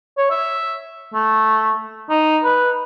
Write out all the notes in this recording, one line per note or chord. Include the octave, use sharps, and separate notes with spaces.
C#5
E5
A3
D#4
B4